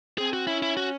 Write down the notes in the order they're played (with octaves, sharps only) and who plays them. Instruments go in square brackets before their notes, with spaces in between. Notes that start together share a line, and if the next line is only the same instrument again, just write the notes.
[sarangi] C4 [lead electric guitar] G#4
[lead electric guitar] F#4
[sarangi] C#4 [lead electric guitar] E4
[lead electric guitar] E4
F#4